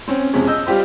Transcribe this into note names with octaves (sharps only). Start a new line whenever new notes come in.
C4 C#4
F2 C3 G#3 C#4
D#5 E6 G6
G3 F4 G4 C5